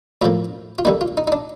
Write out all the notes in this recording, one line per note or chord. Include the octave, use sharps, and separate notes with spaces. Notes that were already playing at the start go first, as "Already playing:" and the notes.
A2 F3 A#3 F4
F4
D3 G3 A#3 D#4
F4
D#4
D#4
D4